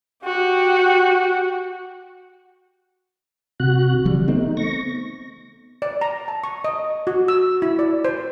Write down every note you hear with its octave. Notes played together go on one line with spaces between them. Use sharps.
F#4 G4
C3 F#4 F#6
C#3 E3 G3
A3 B3 C4 D#4
C#6 A#6
D5
A#5
A5
C#6
D#5
F#4
E6
E4
D5
C5